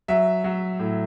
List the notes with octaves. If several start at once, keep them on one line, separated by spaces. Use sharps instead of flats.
F#3 E5
F#3
A2